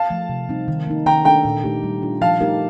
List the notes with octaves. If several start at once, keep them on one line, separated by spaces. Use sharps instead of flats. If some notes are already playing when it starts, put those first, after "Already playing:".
Already playing: F5 A5
F3 A3
C3
G3 C4 D#4
D#3
A#3 D#4
D#3 G5 A#5
A3 D4 A4 G5 A#5
A#2
A3 D#4 G4
G3
D4 F4
F3 F5 A5
A3 D#4 G4 A#4